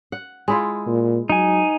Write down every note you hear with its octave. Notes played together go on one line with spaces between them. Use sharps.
F#5
G#3 E4 F4
A#2
F#3 D#4 G#5